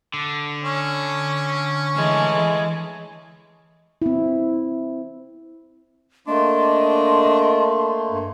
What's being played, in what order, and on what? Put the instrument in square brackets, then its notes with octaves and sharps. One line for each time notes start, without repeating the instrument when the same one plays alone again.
[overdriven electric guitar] D3
[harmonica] C#4
[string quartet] E3 G#3 A3
[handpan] C4 E4
[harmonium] A3 A#3 [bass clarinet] D4 [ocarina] D#5 [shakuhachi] C6
[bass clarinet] G2